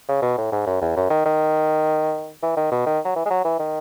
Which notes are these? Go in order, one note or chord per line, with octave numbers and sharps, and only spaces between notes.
C#3
B2
A2
G#2
F#2
E2
F#2
D#3
D#3
E3
D#3
B2
D#3
F#3
E3
G#3
F#3
E3
D#3